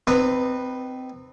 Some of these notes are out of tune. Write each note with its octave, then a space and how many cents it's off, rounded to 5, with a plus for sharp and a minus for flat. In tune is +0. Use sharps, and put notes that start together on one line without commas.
C4 -20 D#4 -30 B4 +0